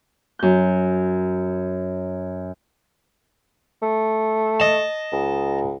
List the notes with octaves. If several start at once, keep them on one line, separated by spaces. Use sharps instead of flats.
F#2 G6
A3
D#5 A5
C#2